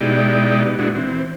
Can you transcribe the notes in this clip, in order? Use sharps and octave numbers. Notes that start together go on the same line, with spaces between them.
B2 G#3 D#4 E4 G4 D5
B3
A#2 G#3 D4 E4 F#4
E3 C4